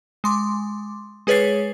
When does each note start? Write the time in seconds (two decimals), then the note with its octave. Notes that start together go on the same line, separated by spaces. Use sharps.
0.24 G#3 C6 D6
1.27 G#3 G#4 B4 C#5 A6 C7